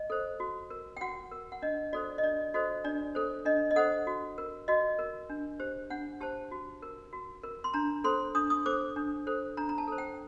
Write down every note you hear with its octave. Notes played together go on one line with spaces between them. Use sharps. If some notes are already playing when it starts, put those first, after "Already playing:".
Already playing: D#5
A4 C5
F#4
A#4
G5
F#4 F#5
A#4
F#5
D4 D#5
F#4 A4 C5 D5
D#5
D4 D5
F#4 A4 C5 D#5
D4 D5
A4 C5
D4 D#5
D#5
A4 C5 F#5
F#4
A#4
F#4 D#5
A#4
D4
G4 C5
D4 F#5
G4 C5 A5
F#4
A#4
F#4
A#4
C6
D4 A#5
A4 C5 C6
D4 D#6
D#6
A4 C5 D6
D4
A4 C5
D4 A#5
A#5
A5
A4 C5
G5